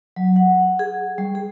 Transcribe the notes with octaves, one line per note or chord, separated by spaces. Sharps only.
F#3
F#5
G#4
G3
G#4